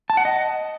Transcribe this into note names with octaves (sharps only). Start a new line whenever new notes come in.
A5
F#5
D#5